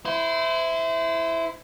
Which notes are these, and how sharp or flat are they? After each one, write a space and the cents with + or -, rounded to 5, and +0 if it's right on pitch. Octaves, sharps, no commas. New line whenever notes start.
E4 +0 C5 -30